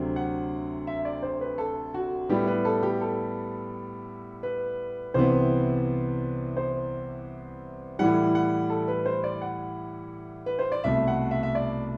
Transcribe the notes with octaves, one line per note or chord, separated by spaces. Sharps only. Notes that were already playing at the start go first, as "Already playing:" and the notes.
Already playing: D2 C3 F#3 C4
F#5
E5
D5
C5
B4
A4
F#4
A2 G3 B3 G4
B4
A4
G4
A4
B4
C2 C3 E3 B3 C5
C5
A2 E3 G3 F#5
F#5
A4
B4
C5
D5
F#5
B4
C5
D5
C2 B2 A3 E5
F#5
E5
E5
D5